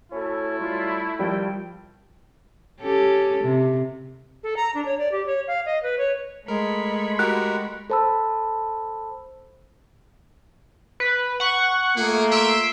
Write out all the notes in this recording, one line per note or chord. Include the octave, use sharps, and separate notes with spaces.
A3 C#4 E4 F#4 A4
F#3 G3 F4
D#3 F3 G3 G5
C#4 G4 A4
C3
A4
A#5
D4
C#5
D5
G4
C#5
F5
D#5
B4
C#5
G#3 A3 A#4 B5 C#6
F#4 G4 A#4 F#6
A4 C5 A5 B5 E6
B4
F#5 C#6
A3 A#3 F4 G#4
E5 C6 E6 D7